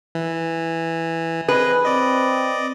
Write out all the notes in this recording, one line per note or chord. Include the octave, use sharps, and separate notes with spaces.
E3
C4 G#4 B4 D#5
C4 D5 D#5